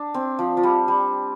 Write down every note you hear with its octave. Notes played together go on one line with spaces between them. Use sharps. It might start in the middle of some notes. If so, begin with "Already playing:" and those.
Already playing: D4
C4
F3
F3
G3
G3